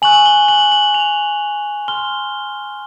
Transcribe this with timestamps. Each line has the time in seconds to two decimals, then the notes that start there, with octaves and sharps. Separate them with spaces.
0.02 G#5 C#6 F#6 F#7
0.26 G7
0.48 F#7
0.72 F#7
0.94 F7
1.88 C6 F6 G7